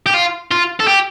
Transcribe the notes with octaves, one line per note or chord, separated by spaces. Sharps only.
G4
F4
F4
A4
G4